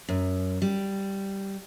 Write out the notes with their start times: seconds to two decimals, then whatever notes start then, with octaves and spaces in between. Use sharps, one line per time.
0.09 F#2
0.62 G3